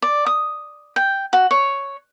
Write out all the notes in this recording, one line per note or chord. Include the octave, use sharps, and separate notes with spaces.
D5
D#6
G5
F#4
C#5